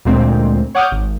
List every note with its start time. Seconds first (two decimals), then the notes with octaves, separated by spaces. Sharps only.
0.05 D2 A#2 G#3 C4
0.75 C#5 F#5 D6 D#6 F6 G6
0.92 G#1